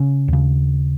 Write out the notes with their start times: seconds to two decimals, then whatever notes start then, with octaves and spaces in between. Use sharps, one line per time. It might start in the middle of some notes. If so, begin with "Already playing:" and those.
Already playing: C#3 C#4
0.28 D#2 C#3